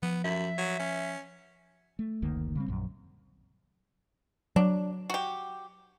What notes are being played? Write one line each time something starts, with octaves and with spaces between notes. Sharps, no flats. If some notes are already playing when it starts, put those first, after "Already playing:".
F3 B3
F#2 E5
F#3
C#4
A3
F#1 D2 D#3 A#3
C#3 G3 C4
A#1 F#2
F#3 D4
F#4 G4